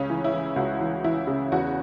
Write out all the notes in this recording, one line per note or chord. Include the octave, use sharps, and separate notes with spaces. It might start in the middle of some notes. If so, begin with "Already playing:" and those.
Already playing: C#2 C#3 C#4
E3
E4
E3
C#2 F#4
E3
E3 E4
C#3
E2 F#4